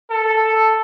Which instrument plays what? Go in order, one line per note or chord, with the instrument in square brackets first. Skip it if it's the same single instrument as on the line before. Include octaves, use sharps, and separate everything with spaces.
[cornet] A4